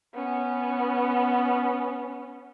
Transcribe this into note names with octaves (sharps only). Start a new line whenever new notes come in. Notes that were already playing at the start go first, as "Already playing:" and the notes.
B3 C#4